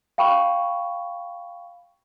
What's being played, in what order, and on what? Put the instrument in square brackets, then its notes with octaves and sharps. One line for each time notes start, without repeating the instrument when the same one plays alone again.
[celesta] F5 G5 B5 C#6